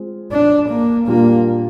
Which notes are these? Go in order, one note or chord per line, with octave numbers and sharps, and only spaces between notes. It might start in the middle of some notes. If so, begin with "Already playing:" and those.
Already playing: G#3 C4 F4 G#4
D4
A#3
A#2 G3 A#3 D4 F4